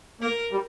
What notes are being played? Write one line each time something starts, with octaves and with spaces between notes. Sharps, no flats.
A#3 A#4
G3